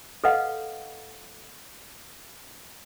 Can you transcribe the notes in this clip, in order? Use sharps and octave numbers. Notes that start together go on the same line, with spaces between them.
A4 B4 D#5 F5 F#5